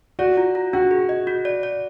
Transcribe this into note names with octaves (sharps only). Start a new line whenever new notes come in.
F#4 D5
F4
F4
D4 F#4
G#4
D#5
F#4
D5
D5